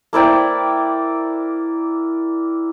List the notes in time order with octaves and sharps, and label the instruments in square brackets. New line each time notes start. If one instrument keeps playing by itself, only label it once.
[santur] A#3 E4 D5 G5